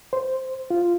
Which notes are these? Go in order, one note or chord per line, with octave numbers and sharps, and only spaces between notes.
C5
F4